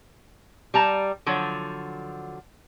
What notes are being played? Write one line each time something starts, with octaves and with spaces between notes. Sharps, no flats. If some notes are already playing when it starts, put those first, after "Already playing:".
G3 A5 A#5
D3 F3 F#3